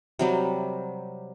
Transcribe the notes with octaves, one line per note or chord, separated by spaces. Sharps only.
C3 F#3 G3